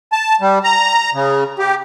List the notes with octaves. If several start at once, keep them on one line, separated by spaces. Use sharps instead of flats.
A5
G3
A#5
C#3
G4